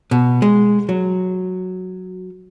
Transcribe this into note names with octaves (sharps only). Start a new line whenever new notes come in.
B2
G#3
F#3